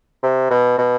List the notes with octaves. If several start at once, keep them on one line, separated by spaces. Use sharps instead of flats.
C3
B2
B2